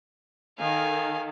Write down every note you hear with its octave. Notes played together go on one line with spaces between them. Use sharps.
D#3 A4 F5 G#5